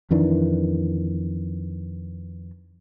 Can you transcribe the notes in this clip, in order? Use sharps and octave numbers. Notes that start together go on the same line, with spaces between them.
F2 D#3 E3 D4